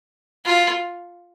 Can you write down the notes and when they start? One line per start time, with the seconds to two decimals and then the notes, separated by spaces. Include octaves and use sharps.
0.45 F4